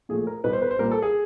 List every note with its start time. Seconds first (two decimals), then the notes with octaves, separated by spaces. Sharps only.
0.09 A#2 F3 A3 G#4
0.27 A#4
0.44 B2 G3 B4
0.53 C5
0.62 B4
0.71 C5
0.79 A#2 G3 A#4
0.91 A4
1.02 G#4